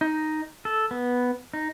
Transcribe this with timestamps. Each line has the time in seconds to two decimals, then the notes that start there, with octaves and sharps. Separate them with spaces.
0.01 D#4
0.65 A4
0.91 B3
1.53 D#4